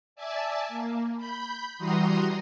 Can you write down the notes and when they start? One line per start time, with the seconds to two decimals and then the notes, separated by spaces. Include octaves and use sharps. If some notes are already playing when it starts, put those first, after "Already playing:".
0.16 D5 E5 G#5 A5
0.68 A#3
1.16 B5 G6
1.78 E3 G3 F#4 A#5 C6 D#6